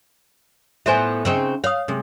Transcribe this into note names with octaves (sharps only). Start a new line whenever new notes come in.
A2 B3 C5 E5 G#5
C#3 C4 D#4
C#5 F5 D#6
C3 G#3